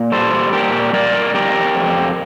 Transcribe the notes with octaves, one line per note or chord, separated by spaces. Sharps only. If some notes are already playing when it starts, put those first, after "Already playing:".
Already playing: A#2
G3 A4 C5
A#2 G4 A#4
G3 A#4 D5
F2 G4 A#4
F2